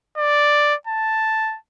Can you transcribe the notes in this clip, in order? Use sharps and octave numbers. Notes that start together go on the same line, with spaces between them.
D5
A5